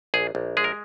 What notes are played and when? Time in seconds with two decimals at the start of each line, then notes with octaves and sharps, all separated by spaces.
0.14 A#1 G#4
0.35 A#1
0.57 G#3 G#4
0.64 A#4